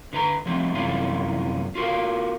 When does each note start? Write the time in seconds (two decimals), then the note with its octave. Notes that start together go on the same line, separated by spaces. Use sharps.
0.13 D3 B4 A#5
0.46 F3 G3 A3 C4
0.74 F#2 C3 E3 G3 C#4 F4
1.75 F4 F#4 A4 A#4 F5